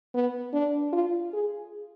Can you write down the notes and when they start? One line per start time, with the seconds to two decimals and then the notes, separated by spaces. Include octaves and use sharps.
0.14 B3
0.53 D4
0.93 F4
1.33 G#4